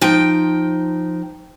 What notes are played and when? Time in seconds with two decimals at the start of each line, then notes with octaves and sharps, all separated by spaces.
0.01 F3 D#4 G5